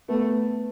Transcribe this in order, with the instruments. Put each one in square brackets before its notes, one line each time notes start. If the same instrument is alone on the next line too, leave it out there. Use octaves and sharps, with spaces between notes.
[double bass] A3 [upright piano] B3